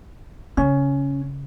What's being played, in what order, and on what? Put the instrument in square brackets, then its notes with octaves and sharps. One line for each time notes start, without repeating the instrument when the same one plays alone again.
[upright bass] C#3 [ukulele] C#4